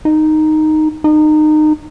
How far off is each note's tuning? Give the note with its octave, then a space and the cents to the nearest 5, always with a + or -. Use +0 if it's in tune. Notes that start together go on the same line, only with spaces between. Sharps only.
D#4 -5
D#4 -25